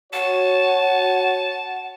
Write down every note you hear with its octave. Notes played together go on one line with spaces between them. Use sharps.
F#4 C#5 F#5 A5